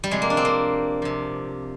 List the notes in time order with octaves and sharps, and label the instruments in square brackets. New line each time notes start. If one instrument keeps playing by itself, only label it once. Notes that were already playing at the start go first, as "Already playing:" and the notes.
[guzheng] G3
C3 F3 G#3
A#3
D4
C4
A#3
C3 F3